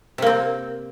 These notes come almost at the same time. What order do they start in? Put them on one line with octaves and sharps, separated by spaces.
C3 A#3 C4